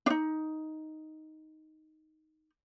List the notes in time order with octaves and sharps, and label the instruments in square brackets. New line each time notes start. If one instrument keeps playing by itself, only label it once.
[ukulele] D4 D#4